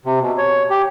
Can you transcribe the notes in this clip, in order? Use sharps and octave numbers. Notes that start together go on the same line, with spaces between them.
C3
B2
C#5
G4